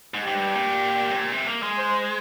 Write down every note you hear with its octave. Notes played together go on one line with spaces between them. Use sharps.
G#2
G#2 G4
G2
A#2
C3
A#2
C3
A#3
G#3
C5